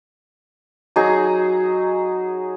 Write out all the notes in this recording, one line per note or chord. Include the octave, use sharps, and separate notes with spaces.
F#3 D#4 G#4